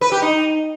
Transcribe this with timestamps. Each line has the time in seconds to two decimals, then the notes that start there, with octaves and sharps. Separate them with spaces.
0.01 B4
0.12 G4
0.22 D#4